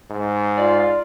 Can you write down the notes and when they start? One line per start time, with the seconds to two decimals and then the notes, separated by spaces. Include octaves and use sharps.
0.10 G#2
0.58 F4 D5